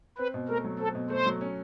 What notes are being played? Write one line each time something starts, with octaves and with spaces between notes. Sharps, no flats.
C4 B4
B2
A3 A#4
F#3
C4 A4
B2
A3 C5
F#3
C#4